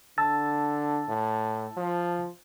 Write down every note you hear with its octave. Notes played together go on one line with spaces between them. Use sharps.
D3 A5 E6 A6
A2
F3